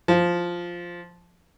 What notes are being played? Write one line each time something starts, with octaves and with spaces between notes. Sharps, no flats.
F3